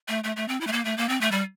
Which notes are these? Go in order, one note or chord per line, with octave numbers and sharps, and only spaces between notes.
A3
A3
A3
C4
E4
A3
A#3
A3
A#3
C4
A3
G3